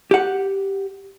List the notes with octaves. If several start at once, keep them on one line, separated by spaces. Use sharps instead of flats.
G4 F#5